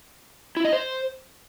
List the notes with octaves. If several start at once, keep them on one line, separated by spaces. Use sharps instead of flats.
E4
D#5
C5